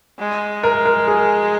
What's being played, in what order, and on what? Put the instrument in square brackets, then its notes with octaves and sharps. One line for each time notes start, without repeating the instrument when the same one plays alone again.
[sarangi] G#3
[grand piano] A#4
A#4
G#4